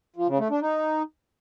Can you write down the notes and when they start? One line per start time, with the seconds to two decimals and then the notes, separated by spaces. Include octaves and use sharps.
0.16 F3
0.28 C#3
0.39 A3
0.50 D4
0.62 D#4